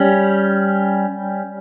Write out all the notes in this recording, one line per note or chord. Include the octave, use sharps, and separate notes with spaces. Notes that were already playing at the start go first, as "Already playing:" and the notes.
Already playing: G3 C#4